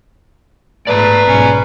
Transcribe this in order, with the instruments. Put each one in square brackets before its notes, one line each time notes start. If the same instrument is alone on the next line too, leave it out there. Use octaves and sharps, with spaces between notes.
[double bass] G#2 [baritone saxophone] A3 [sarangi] B4 [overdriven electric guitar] D5 A#5
[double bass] B1 G#2 [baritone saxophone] C#4